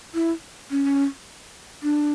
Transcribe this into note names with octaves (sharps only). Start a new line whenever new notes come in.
E4
C#4
D4